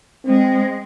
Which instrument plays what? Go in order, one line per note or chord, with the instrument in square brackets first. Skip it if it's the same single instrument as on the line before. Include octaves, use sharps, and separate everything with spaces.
[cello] G#3 [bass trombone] C4